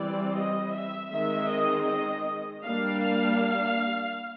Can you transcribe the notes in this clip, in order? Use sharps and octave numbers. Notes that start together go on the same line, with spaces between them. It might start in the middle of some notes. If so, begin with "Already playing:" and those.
Already playing: E3 G3 C4 D5
D#5
E5
D#3 G#3 C4 E5
D#5
D#5
G3 A#3 D4 F5
F5